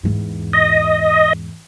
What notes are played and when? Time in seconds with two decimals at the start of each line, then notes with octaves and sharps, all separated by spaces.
0.03 E2 G#2
0.53 D#5